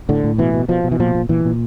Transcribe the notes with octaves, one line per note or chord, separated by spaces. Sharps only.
A2 D3
A2
B2 E3
B2
B2 F3
B2
E3
A#2 F3
A#2
A#2 E3
A#2